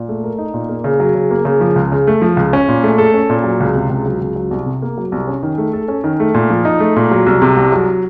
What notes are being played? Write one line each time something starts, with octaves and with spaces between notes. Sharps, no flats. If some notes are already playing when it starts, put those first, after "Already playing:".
Already playing: A#2
A3
A#4
D#4
A#2
A#3
C#3
F#3
C#3
A#3
C#3
F3
C#2
C#3
A3
F3
C#2
C#4
A#2
A3
A4
C#4
A#2
F#3
C#2
C3
C#2
F#3
C#2
F#3
C2
C3
A#3
F#3
C2
C#4
D#3
A3
A4
C#4
D#3
A3
A#2
F3
D#4
A3
A#2
F#3
C2
C3
C2
F#3